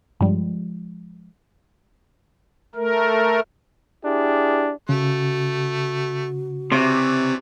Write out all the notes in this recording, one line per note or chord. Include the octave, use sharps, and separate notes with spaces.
G2 F3 G3 G#3
A3 A#4
D4 E4 G4 G#4
C#3 A3 F#4
C3 E3 C#5 D5